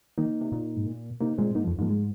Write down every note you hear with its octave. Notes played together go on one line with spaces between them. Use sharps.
D#3 A#3 D#4
C3
A#2
G#2
A#2
C3 A#3 D#4
A#2 G#3 C4
G#2 A#3 D#4
F3
F2
G#2 F3 A#3
G#3